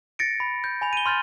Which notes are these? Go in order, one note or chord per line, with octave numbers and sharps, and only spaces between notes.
A6 A#6 C#7 D7
B5
G6
G#5 B5 F7
D#7 G7
C6 F6 G6 A6